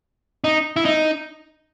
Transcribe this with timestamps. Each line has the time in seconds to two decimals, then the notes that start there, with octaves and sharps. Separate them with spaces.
0.44 D#4
0.76 E4
0.85 D#4